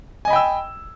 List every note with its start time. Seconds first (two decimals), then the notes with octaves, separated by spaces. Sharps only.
0.25 G#5
0.28 D#5
0.30 B5
0.33 G5
0.36 E6